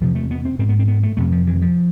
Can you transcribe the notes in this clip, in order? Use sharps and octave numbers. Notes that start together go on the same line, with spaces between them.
E2 C3 F3
A3
B3
C4
G#2 C4
B3
C4
B3
A3
F2 C3 A3
F3
E3
F3